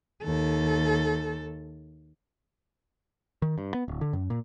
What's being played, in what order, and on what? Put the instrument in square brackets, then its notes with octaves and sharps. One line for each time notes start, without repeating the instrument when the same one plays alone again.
[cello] D#2 A4
[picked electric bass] D#3
G2
B3
D1
D3
F#2
A#2